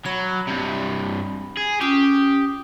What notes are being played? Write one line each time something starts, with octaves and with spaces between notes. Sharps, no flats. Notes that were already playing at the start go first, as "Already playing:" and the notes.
F#3 B5
G2 C3
G#4
C#4 F4 G4 D#6